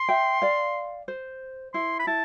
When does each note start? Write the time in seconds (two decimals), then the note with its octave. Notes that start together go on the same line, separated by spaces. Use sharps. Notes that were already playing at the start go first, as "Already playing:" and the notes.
Already playing: C6
0.09 E5 G5
0.42 D5 F5
1.08 C5
1.74 E4 C6
2.00 B5
2.07 E4 A5